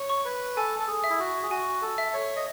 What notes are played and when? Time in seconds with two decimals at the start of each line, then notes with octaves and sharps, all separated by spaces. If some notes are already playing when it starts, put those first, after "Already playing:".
Already playing: C#5
0.10 C#6
0.25 B4
0.56 A4 G#5
0.79 A4
0.87 G#4
1.04 E5
1.10 E4
1.19 F#4
1.43 G#4
1.51 F#4 G#5
1.82 A4
1.98 E5
2.13 C#5
2.36 D#5